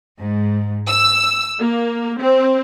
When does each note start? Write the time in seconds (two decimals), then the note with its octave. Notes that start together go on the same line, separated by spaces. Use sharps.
0.20 G#2
0.88 E6
1.60 A#3
2.20 C4